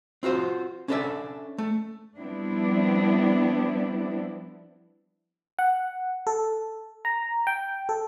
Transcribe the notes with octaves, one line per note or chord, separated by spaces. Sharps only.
C4 F4 F#4 C5
C#4 D4 A4 B4 D5 E5
A3
F3 G3 B3 C4 D4 E4
F#5
A4
A#5
G5
A4